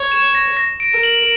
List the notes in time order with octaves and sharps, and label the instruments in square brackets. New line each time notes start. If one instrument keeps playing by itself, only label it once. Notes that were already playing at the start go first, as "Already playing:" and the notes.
Already playing: [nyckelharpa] C#5
[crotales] E7
A#6
A#6
D7
[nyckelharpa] A#4
[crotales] F#7